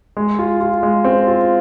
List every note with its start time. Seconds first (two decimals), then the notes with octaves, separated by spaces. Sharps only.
0.17 G#3
0.39 F4
0.61 F4
0.83 G#3
1.05 C4
1.27 F4